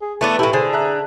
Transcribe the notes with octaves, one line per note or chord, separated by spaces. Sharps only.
G#4
E3 A3 B3 D4
A2 E4 G4
D3 G#4 C5
E5 A#5 F#6